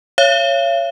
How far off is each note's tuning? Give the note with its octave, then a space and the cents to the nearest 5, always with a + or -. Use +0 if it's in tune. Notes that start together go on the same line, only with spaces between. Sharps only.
C#5 +0 F5 -45